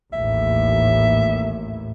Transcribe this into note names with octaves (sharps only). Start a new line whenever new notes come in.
A1 D#2 A2 E5